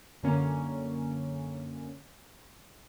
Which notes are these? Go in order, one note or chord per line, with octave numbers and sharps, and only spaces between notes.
F#2 D3 A#3 C#4